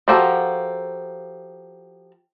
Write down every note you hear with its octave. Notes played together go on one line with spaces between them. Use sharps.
F3 F#4 G4 A4 A#4